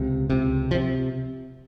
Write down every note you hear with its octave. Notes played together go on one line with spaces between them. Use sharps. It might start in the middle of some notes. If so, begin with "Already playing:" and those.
Already playing: C#2 C3
C#2 C3
F3
C3